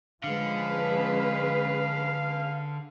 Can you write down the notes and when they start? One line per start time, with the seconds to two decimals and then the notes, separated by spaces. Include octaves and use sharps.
0.24 D3 F3 G#3 C#4 G#4 B4 F5